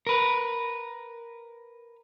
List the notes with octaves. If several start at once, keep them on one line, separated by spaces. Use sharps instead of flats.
A#4 B4